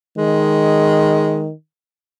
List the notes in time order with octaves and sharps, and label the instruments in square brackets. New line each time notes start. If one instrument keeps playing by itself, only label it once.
[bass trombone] D#3 [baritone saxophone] G#3